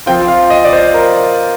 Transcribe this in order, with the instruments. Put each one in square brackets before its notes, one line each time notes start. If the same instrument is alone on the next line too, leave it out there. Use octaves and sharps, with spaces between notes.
[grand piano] F3 C4 F4 G5
F5
D#5
D5
C5
A#4